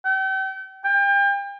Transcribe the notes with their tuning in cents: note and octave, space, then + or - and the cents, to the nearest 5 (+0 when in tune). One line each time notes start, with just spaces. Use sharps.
G5 -40
G5 +35